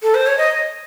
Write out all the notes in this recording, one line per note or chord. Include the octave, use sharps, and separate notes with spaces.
A4
C5
C#5
D#5